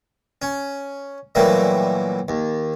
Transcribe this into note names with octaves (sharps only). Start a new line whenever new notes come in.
C#4
A#2 E3 F#3 G3 A3
D#2